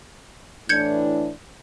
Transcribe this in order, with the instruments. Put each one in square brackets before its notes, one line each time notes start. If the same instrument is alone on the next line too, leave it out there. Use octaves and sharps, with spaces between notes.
[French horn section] A2 E3 D4 [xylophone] G6 G#6 C#7